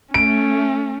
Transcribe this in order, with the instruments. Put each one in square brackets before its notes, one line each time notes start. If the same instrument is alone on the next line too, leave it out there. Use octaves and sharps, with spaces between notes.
[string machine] A3 [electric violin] C#4 [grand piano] D7